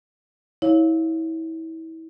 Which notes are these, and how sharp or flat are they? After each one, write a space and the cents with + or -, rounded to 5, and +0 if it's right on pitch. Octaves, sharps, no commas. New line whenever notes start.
E4 -30 C#5 +0 F5 +0